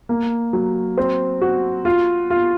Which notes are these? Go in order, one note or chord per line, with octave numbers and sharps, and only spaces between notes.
A#3
F#3
C4
F#4
F4
F4